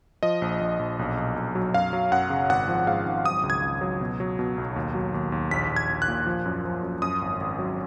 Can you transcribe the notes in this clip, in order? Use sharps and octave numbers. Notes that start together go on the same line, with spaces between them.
F3 D#5
A#1
A#1
A#1
B1
B1
B1
F#3
F#2 F5
F#3
F#2 F#5
C#3
G#1 F#5
F3
G#2 F5
G#1
F#3 D#6
C#2
G#6
C#2
F#3
B2
F#3
B2
B1
D#2
F#3
D#2
D#2
A#1 B6
A#1
G#6
A#1
F#6
A#2
F3
F#2
F3
F#2
F#2 D#6
G#1
G#1
F#3